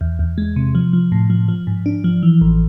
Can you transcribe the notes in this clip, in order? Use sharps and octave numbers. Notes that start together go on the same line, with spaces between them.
E2
E2
G#3
C3
F3
F3
A2
F3
F3
G#2
D4
F3
E3
A1